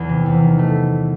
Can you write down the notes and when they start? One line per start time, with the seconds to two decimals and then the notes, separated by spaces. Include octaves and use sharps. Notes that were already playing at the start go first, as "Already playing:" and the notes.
Already playing: E2
0.09 C3
0.26 E2
0.43 D#3
0.59 A3